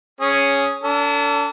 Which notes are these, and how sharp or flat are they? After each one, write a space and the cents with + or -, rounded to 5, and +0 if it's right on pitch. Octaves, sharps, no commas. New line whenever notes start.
C#4 +0 G#4 +0
D4 -40 A4 +30